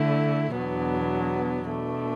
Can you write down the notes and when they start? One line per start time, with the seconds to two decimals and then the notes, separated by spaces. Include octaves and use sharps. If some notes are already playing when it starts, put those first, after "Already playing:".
Already playing: D3 A3 E4
0.53 E2 B2 F#3 B3 D4
1.67 B2 A3 D4